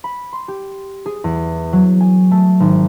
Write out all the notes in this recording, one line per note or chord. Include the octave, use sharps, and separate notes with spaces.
B5
C6
G4
G#4
E2
F#3
G#5
A3
G#1